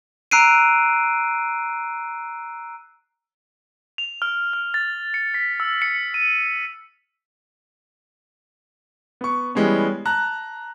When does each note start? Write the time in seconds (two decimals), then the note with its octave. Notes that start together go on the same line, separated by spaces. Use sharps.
0.31 A#5 E6 F#6 C7 D7 D#7
3.98 F7
4.22 F6
4.53 F6
4.74 A6
5.14 C#7
5.34 B6
5.60 E6
5.82 C#7
6.14 D#7
9.21 B3 C#6
9.55 E3 G3 G#3 B3 C#4
10.05 A5 A#5 F#6